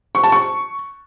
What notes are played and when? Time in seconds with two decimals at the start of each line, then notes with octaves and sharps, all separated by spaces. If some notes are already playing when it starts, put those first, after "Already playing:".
0.15 C#6
0.24 A5
0.32 C#6